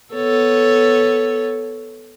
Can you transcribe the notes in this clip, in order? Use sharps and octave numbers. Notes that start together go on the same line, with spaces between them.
B3 A4 C#5